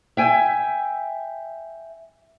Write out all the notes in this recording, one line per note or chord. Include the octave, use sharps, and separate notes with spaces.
E5 G5 G#5